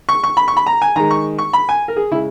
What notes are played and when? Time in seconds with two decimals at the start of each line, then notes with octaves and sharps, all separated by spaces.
0.09 C#6
0.24 C#6
0.37 B5
0.48 C#6
0.57 B5
0.66 A#5
0.82 G#5
0.96 D#3 G#3 A#5
1.11 C#6
1.38 C#6
1.53 B5
1.69 G#5
1.88 A#4
1.97 G#4
2.11 C#3 G#3 E4